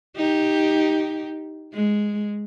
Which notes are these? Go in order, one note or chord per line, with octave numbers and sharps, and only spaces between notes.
D#4 G4
G#3